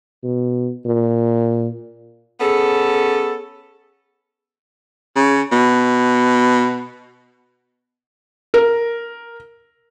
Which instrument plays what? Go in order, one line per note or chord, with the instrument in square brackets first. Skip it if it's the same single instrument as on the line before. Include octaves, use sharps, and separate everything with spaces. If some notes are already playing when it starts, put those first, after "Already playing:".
[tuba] B2
A#2
[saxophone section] B3 C#4 A4 [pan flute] G#4
[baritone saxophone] C#3
B2
[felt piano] A#4